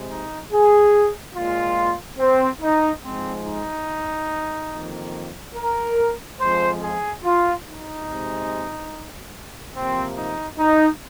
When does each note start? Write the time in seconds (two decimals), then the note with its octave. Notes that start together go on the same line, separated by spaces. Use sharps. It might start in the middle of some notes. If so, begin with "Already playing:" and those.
Already playing: C3 G#3
0.10 D#4
0.52 G#4
1.36 A#2 G#3 F4
2.19 C4
2.62 D#4
3.03 G#2 F3 G#3 C4
3.45 D#4
4.71 F2 D#3 A#3
5.55 A#4
6.39 F2 F3 G#3 C5
6.82 G#4
7.24 F4
7.66 D#4
8.07 C3 G#3
9.75 C3 F3 A#3 C4
10.17 D#4
10.59 D#4